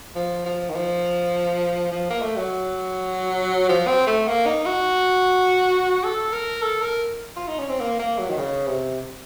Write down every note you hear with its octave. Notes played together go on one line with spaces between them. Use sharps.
F3
F3
D#3
F3
F3
A#3
A3
F#3
F3
C4
A3
A#3
D#4
F#4
A4
A#4
A4
A#4
F4
D#4
C#4
C4
A#3
A#3
F#3
D#3
C#3
C3